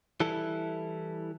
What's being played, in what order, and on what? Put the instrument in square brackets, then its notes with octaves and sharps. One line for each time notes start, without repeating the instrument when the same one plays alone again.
[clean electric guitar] E3 G3 E4 A4